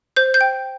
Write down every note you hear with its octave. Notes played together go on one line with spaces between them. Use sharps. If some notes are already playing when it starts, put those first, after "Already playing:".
C5 G6
G6
G5